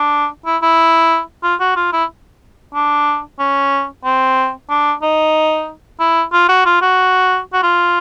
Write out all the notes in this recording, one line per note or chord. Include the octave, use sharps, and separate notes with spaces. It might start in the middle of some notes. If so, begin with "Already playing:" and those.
Already playing: D4
E4
E4
F4
F#4
F4
E4
D4
C#4
C4
D4
D#4
E4
F4
F#4
F4
F#4
F#4
F4